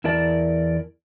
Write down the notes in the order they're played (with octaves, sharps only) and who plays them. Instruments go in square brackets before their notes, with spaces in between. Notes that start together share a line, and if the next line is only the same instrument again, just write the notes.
[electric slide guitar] E2 E4 A#4 D5 A5